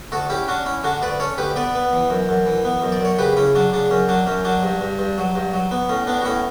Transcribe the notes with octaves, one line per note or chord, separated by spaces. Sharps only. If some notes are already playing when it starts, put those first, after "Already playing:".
D2 F#4 A4
C#4 E4 G4
C#4 D4 F#4
C#4 E4
D3 D4 F#4
D2 B4 D5
C#4 A4 C#5
D2 G4 B4
B3 B4 D5
B3
E3
F#2
F#2
E3
B3
F#2
D5
F#2 C#5
C#3 G4 B4
C#3 C#4 E4
F#3 D4
C#3 D4
F#2 C#4
F#3 D4
F#2 C#4
F#3 D4
G2
G2
G2
F#3
G2
F#3
B3
A2 C#4
B3 D4
F#4
A2 C#4 E4